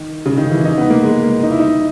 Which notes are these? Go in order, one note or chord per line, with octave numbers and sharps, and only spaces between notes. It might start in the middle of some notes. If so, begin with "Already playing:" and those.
Already playing: D#3
C#3
D#3
E3
D#4
B3
A#3
G#3
A#3
D#4
E4
D#4